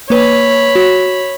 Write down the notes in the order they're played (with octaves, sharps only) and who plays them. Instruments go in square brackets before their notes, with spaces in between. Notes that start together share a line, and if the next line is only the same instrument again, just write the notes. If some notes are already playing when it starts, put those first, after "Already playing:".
[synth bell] A#3 B4 [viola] C#5 B5
[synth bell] F#4